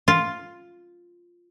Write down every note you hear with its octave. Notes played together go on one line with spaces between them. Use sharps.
F4